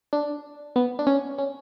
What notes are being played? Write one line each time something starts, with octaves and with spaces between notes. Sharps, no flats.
D4
B3
D4
C#4
C#4